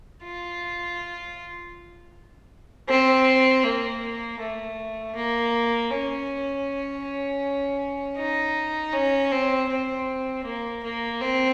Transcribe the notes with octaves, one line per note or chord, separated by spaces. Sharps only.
F4
C4
A#3
A3
A#3
C#4
D#4
C#4
C4
C4
A#3
A#3
C4